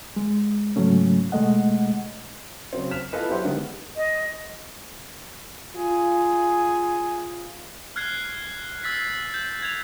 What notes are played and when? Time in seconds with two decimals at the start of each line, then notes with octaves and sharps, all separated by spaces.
0.16 G#3
0.76 G#2 C#3 F#3 A3 C#4
1.32 B2 G#3 A3 D#5 F#5
2.73 C#3 F#3 C4
2.91 F6 B6 E7
3.12 B3 E4 F4 A4 B4 D#5
3.29 F#3 G4 C5 E5 F#5
3.44 D3 D#3 G3 G#3 B3
3.97 D#5
5.76 F4 G#4
7.96 F6 F#6 G#6 C7
8.83 E6 A6 B6 C7
9.34 G6
9.63 G#6 F7